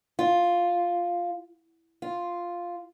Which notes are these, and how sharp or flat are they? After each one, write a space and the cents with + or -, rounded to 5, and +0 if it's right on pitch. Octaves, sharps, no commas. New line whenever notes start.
F4 +0
F4 +0